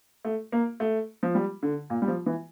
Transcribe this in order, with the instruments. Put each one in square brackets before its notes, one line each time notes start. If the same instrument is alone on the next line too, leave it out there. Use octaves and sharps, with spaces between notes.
[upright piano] A3
A#3
A3
F3
G3
D3
A#2
G3
F3
E3